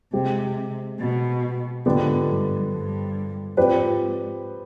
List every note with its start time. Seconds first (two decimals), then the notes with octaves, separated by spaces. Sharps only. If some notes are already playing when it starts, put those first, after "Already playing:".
0.13 C3 G#3 C4 G4
0.99 B2
1.86 G#2 D3 F3 B3 D4 G4
2.28 G2
2.72 G2
3.57 G#2 F3 C4 G4 B4 D5